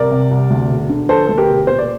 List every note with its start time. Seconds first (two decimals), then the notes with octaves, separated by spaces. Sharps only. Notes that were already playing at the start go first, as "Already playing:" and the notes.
Already playing: C2 A#4 D5
0.11 C3
0.31 C2
0.50 D2
0.69 E1
0.89 D3
1.08 F3 A4 C5
1.26 D2 A4
1.38 G4 A#4
1.48 E1
1.67 A#2 C5
1.79 D5